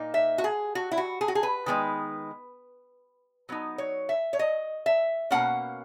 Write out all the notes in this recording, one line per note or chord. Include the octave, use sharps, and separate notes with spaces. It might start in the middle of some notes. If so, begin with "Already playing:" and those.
Already playing: A#2 A#3 D#4
E5
F#4
G#4
F#4
E4
F#4
G#4
F#4
G#4
B4
D#3 G#3 B3 D#4
F#3 B3 D#4
C#5
E5
C#5
D#5
E5
B2 A#3 C#4 F#5